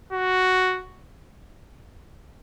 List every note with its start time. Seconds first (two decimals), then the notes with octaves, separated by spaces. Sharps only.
0.12 F#4